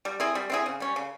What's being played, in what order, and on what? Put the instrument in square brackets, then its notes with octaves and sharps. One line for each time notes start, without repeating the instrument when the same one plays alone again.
[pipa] G3
C4 E4 G#4
G3
C4 E4 G#4
C#3
G3 C#4
C#3